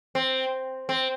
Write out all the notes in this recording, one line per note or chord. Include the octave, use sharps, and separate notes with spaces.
C4
C4